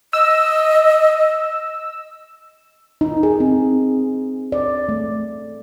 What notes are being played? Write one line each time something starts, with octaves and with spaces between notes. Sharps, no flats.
D#5 E6
D#4
G#4
C4
D5
A3